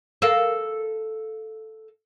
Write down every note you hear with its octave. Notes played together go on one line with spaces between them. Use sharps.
A4 A#4 F5